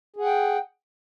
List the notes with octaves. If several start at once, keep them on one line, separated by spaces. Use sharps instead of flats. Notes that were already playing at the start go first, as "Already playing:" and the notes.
G#4 F#5 G5